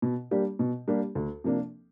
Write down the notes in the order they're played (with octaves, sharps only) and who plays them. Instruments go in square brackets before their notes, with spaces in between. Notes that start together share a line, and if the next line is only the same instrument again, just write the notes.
[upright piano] B2
G3 A#3 D4 G4
B2
G3 A#3 D4 G4
D2
C3 F3 A#3 D4